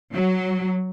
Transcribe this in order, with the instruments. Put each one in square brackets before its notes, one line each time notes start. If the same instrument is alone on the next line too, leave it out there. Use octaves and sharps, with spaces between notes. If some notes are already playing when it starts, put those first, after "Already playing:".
[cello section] F#3